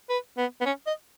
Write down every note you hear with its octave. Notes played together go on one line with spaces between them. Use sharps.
B4
B3
B3
C#4
D#5